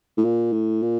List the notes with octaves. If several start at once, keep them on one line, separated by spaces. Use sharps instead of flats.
A2
A#2
A2
A#2